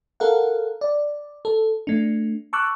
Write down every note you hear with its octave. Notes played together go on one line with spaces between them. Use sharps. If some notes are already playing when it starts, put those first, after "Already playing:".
A4 A#4 F5 F#5
D5
A4
A3 D4
A5 C#6 D6 E6 F#6